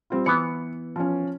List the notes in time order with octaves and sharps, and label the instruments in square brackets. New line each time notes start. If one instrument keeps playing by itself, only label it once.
[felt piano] G3 C4 F4
[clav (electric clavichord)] E3 B3 [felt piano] C#7
[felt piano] F3 C#4